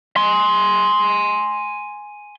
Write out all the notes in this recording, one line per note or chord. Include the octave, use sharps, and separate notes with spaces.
G#5 C6